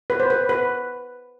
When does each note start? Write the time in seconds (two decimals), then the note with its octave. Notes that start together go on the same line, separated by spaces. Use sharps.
0.10 B4
0.20 C5
0.30 B4
0.49 B4